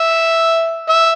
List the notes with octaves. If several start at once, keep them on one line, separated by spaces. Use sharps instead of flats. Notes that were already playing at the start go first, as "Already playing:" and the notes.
Already playing: E5
E5